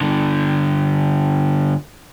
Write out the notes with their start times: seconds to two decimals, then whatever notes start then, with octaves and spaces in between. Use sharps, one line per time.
0.01 G2 D3